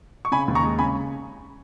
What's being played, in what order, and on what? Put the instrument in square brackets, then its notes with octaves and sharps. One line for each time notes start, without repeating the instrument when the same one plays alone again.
[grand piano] C#6
C#3 G#5 B5
D#2
A#5 C#6
G#3
C#3 G#5 B5